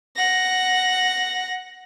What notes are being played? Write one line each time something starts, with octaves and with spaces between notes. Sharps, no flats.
F#5 A#6